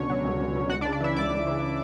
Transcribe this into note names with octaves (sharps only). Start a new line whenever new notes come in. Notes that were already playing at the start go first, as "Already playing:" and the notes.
Already playing: C#2 B2 D3 C#4 C#5
F#3
C#2
C#2
B2
C#2 F#4 F#5
D4 D5
C#3
D4 D5
E3 E4 E5
C#2 D5 D6
C#2
C#3